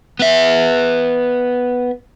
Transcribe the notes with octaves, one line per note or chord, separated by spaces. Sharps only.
B3 E5